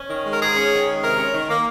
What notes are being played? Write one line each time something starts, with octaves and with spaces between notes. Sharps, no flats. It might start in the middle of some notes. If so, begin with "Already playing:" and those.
Already playing: C#4
D#3
G#3
A#4
G#2 G#4
C#4
D#3
G#3
C3 A#4
C#4
D#3
A#3